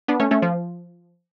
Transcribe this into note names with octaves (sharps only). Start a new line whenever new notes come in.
B3 D4
A3 C#4
A3 C#4
F3